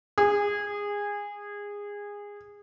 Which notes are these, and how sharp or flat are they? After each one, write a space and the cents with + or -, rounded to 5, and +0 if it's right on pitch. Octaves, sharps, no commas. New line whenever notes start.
G#4 -20